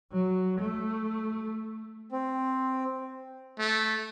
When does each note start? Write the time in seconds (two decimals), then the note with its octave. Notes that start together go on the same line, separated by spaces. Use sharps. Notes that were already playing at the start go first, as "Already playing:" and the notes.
0.11 F#3
0.60 A3
2.12 C4
3.59 A3